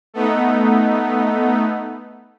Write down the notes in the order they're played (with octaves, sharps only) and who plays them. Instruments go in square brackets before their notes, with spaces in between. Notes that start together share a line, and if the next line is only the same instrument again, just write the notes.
[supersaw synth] A3 B3 D#4